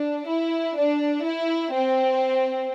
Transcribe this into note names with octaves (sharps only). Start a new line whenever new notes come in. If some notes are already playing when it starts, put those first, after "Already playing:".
Already playing: D4
E4
D4
E4
C4